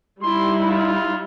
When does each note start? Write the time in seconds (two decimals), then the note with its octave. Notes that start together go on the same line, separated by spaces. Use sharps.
0.23 G3 D#4 E4 C6
0.69 F4